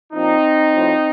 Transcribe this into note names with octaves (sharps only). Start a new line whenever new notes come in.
A#2 F3 C4 D#4
A2 F3